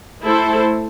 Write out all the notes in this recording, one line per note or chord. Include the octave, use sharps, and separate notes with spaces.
A3 E4 A4 C5